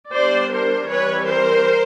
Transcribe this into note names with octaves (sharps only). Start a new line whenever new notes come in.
G3 B3 D4 C5 D5
A#4 C5
E3 G3 C4 B4 C#5
A#4 C5